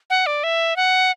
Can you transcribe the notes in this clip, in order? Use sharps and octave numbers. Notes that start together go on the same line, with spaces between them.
F#5
D5
E5
F#5